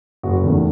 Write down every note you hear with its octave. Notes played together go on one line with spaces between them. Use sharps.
F#1 F#4
E2 D#3 A3